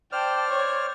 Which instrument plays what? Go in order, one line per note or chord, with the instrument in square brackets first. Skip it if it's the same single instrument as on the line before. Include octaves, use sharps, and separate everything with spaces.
[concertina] C5 D5 F6 [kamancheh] G5 A5
[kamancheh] C#5